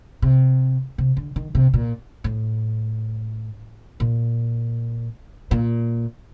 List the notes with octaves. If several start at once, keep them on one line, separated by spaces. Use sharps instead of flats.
C3
C3
D3
D#3
C3
A#2
A2
A#2
A#2